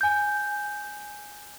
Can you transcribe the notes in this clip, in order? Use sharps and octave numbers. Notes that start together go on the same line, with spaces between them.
G#5 G6